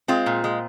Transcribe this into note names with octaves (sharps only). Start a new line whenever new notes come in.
G#3 C4 F4
A#2
G#3